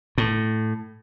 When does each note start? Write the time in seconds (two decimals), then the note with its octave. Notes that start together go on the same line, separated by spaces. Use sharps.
0.18 A2